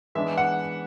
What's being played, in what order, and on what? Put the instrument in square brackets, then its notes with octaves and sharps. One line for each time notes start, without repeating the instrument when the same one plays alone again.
[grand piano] E3 G#3 B3 D4 E5
F#5